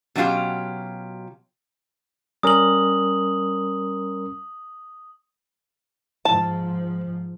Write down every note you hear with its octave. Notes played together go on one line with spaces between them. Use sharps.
B2 F#3 C#4 D#4 F4 G4
G3 C#4 A#4 D#6 F#7
G#2 F3 A5